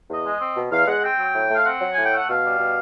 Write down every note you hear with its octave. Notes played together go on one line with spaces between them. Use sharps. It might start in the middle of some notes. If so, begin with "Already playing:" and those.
E2 D#5
G#3
C4
B2
E2 F5
G#3 F#5
C4 G5
F#3
A2
A3
F5
C4 F#5
F#3
G#5
A2
G5
A3 F#5
B2 F5
G3
B2